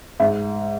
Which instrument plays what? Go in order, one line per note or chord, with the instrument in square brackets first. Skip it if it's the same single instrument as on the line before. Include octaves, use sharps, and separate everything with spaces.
[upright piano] G#2 E5